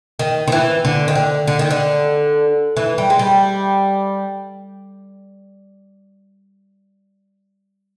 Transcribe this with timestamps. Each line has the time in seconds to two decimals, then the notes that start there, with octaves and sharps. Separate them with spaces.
0.19 D#3
0.47 D#3
0.52 E3
0.85 D3
1.08 D#3
1.15 D3
1.47 D3
1.59 D#3
1.70 D3
2.77 E3
2.98 G3
3.10 G#3
3.19 G3